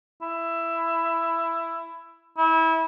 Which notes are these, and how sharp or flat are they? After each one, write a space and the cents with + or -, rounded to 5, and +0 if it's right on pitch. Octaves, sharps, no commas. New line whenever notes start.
E4 +15
E4 -25